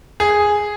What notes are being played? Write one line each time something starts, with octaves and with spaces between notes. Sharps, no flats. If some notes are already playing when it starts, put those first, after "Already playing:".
G#4